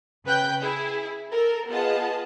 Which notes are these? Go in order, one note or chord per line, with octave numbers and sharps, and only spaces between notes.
C#3 B4 G5 F#6 G6
E4 G#4
A4 A#4
B3 F4 G#4 D#5 A5